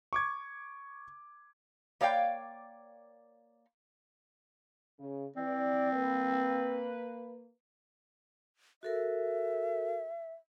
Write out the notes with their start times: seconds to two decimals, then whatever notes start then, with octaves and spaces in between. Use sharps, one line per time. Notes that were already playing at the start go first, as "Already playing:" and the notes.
0.13 C#6 D6 G#6
2.01 A#3 C#5 D5 F5 G5
4.99 C#3
5.36 E3 C4 D5
5.93 A#3 B4
8.83 F#4 A4 A#4 E5